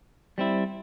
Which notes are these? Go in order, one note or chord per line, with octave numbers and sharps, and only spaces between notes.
G3 C4 E4